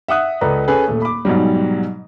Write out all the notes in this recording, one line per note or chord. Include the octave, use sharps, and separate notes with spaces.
E5 F#5 D#6 F#6
C#2 A4 B4 D5 A#5
C#4 G#4 A4 B4
D#1 A3
B5 D6
G#2 B2 F#3 G3